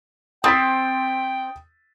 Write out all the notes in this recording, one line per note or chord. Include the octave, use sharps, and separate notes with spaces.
C4 G5 D#6 A6 B6